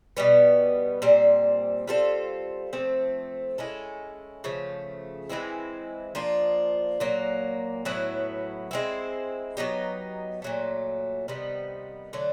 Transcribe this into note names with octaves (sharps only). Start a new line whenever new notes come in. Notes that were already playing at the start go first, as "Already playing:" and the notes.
B2 G3 B3
A#2 G3 C4
G3 C4 F4 A4
F3 A3 C4
G#3 C#4 E4 A4
C#3 F3 A3
E3 G#3 C4 E4
F3 A#3 D4 F4
A#2 F#3 A#3
A2 F#3 B3 E4
G#3 C4 E4
F#3 B3 D#4 G4
A#2 F#3 A3
C3 D#3 G3 B3
D3 F#3 A3 D4